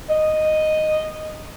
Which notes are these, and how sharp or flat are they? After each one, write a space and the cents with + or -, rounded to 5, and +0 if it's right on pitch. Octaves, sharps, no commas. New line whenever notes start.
D#5 -5